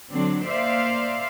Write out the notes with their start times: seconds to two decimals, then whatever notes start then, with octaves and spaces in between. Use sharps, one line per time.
0.11 D3 F#3 C4 D4
0.45 A#3 C5 D5 E5 F5